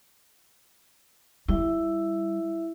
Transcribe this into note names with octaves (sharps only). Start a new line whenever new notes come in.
G3 E4 E5